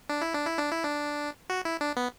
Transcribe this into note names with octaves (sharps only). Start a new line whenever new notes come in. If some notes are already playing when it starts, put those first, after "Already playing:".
D4
E4
D4
E4
D4
E4
D4
F#4
E4
D4
B3